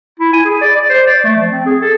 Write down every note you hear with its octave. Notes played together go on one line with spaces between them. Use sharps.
E4
G#5
G#4
D5
D5
C5
D5
A3
F3
C4
G#4
A4